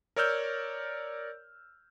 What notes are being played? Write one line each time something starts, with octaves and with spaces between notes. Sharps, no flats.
A#4 C#5 D5 E6 F6 G6